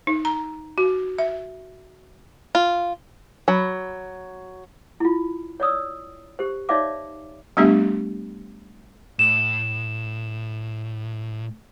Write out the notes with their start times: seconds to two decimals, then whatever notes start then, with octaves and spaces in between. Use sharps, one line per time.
0.07 D#4
0.25 A#5
0.78 F#4
1.18 E5
2.55 F4
3.48 F#3 B5
5.00 E4 F4
5.60 C#5 D5 D#6 E6
6.39 G4 C5
6.69 D#4 C#5 D5 E5 F5 D6
7.57 G3 A3 B3 D4 G4 E5
9.19 A2 E7